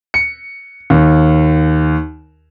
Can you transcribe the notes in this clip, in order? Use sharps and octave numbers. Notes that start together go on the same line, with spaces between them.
C#7
D#2